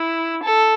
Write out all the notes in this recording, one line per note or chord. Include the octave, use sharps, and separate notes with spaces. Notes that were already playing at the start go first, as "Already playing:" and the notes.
Already playing: E4
A4